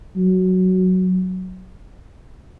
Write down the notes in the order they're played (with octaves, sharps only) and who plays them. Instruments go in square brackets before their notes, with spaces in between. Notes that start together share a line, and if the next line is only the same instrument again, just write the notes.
[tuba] F#3